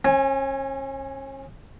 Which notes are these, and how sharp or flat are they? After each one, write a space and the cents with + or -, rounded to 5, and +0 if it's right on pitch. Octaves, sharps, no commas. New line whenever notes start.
C#4 -40 G#5 +0